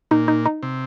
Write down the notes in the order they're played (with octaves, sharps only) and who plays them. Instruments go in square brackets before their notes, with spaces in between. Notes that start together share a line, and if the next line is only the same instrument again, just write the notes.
[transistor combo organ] A#2 [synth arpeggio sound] D#4
[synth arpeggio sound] D#4
D#4
[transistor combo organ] C3